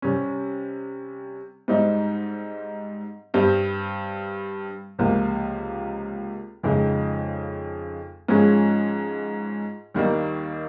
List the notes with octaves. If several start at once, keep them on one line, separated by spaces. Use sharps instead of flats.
C3 G3 C#4
G#2 G3 C4 D#4
G2 G3 C4 G4
C#2 C3 F3 A#3 F4
F2 C#3 F3 G#3 D#4
G#2 F3 G#3 C#4 G#4
D#2 D#3 G3 A#3